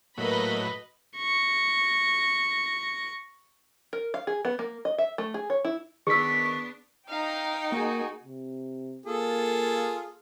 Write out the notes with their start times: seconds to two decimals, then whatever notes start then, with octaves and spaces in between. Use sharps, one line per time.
0.17 A2 F#3 A#3 B4 D#5 B5
1.17 C#6 A#6
3.93 A#4
4.14 F5
4.27 G#4
4.45 B3
4.59 A#3
4.85 D#5
4.98 E5
5.18 A3
5.34 G#4
5.50 C#5
5.65 E4
6.07 D#3 B3 D4 G#4 C#6 E6 B6
7.08 D#4 F5 G5 A#5
7.72 A#3 F#4 G#4
8.23 C3
9.06 A#3 F4 G#4 A4